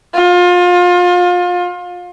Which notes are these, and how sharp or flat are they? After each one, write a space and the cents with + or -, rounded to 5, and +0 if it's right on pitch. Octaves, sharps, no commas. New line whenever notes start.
F4 +30